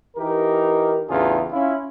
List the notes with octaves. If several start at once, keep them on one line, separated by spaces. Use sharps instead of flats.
E3 D#4 G4 A#4
A1 E2 C#3 D4 F4 G#4
C#4 E4 F4